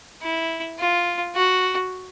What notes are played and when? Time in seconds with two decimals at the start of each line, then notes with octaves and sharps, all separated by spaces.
0.21 E4
0.79 F4
1.35 F#4